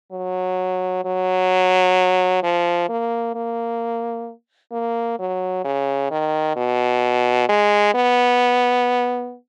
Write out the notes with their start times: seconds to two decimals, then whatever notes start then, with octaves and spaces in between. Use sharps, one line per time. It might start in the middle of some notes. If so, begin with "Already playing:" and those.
0.12 F#3
1.05 F#3
2.43 F3
2.89 A#3
3.35 A#3
4.72 A#3
5.19 F#3
5.64 C#3
6.11 D#3
6.56 B2
7.49 G#3
7.94 B3